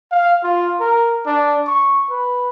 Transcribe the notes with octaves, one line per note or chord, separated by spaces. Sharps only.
F5
F4
A#4
D4
C#6
B4